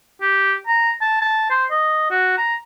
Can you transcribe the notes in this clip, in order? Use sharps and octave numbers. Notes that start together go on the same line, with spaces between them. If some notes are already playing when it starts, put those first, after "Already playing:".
G4
A#5
A5
A5
C5
D#5
F#4
A#5